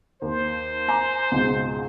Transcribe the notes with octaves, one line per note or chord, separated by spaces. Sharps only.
D#2 C5
G#5 A#5 D6
C#2 G#2 B2